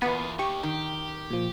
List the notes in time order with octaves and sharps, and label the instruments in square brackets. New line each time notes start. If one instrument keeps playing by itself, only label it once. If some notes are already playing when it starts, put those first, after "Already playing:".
[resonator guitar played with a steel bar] E2 A#2 [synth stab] B3 [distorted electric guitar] F4 G#4
[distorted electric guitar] D#2 D#3 [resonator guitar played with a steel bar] G4 [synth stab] C#6
[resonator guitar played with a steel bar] D#3 [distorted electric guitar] G4
[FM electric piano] A#2 F3